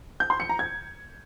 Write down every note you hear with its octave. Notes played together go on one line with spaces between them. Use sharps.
G6
C6
C#7
A#5
G#6